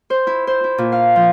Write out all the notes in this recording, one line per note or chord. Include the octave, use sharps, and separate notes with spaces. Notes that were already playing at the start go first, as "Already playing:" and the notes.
C5
E4
C5
E4
A#2
F5
F3